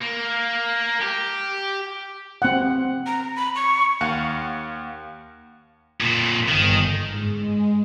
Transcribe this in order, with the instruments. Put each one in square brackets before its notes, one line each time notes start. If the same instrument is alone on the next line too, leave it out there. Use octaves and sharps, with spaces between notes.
[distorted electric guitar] A#3
G4
[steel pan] C4 F#5
[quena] A#5
B5
C#6
[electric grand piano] D#2 F5 F#5 C#7
[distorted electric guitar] F2 A#2
[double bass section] G1 [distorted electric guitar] D#3
[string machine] G#2
G#3